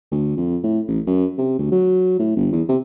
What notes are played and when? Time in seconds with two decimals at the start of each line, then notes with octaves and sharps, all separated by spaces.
0.12 D2
0.37 F2
0.64 A2
0.88 A1
1.07 F#2
1.38 C3
1.59 D2
1.72 F#3
2.19 A2
2.36 G1
2.52 E2
2.68 C3